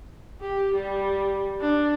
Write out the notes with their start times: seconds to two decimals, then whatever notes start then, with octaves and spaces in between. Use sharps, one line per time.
0.41 G4
0.74 G3
1.61 D4